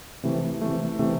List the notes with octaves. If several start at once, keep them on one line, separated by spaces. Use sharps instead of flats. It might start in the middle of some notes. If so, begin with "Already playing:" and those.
C3 E3 A3
C3 E3 A3
C3 E3 A3